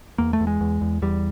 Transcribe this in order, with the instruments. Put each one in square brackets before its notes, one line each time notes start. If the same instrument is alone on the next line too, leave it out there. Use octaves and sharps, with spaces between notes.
[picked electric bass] E2 A#3
A3
E2
G#3
E2
E2
E2 G3